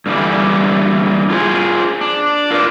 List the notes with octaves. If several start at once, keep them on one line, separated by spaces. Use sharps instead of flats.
G2 D3 E3 G3
F4 G#4 C5
D4
F4 A#4 B4 D5